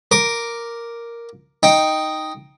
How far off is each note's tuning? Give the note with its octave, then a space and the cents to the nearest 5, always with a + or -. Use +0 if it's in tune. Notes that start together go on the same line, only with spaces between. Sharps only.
A#4 +0 D6 +0
D#4 +0 G5 +0